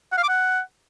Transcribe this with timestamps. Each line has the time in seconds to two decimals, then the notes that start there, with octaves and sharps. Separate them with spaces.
0.12 F#5
0.18 F5
0.23 D6
0.29 F#5